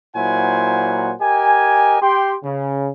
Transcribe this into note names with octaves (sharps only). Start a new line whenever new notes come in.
A#2 F#3 E4 C5 F#5 G#5
G4 A#4 D#5 G#5
G4 G5 C6
C#3